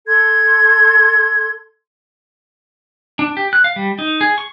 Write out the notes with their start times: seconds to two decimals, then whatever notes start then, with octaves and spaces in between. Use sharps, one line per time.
0.07 A4 C6 G#6
3.19 D4
3.37 G4
3.53 F#6
3.64 F5
3.76 G3
3.99 D#4
4.21 G#4
4.38 C#6